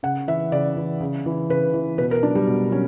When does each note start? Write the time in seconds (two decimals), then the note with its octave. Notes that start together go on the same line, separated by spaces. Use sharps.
0.03 C#3 F#5
0.28 E3 E5
0.52 C#3 D5
0.77 E3
1.01 C#3
1.26 E3
1.50 C#3 B4
1.74 E3
1.98 B2 B4
2.11 A#4
2.23 F#3 D4
2.35 G3
2.47 B2
2.72 F#3 C#4